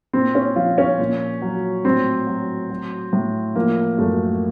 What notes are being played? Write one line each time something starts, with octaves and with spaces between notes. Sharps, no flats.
A#2 C4
C#4
F3 F4
C#4
A#2
F#3
A2 C4
F#3
F#3
A2
F3 A#3
F#2 A3